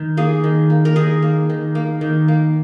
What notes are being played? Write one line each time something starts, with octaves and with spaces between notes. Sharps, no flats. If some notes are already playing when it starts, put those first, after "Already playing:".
Already playing: D#3
A#3 G#4
D#3
A#3
A#4
D#3 G#4
A#3
D#3
A#3
D#3
A#3